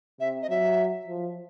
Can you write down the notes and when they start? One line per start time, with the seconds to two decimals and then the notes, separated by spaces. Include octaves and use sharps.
0.20 C3 E5
0.42 D#5
0.50 F#3 E5
1.07 F3